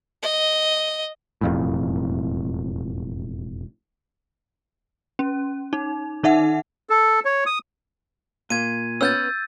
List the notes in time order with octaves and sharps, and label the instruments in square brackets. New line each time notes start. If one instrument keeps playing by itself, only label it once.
[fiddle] D#5
[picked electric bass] E1 F2 A2
[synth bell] C#4
D#4
D#3 D#4 E5 F#5
[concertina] A4
C#5
D#6
[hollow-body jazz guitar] A#2 [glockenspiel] G#6 D#7
[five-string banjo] B3 C#4 [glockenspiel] E6 G6 A6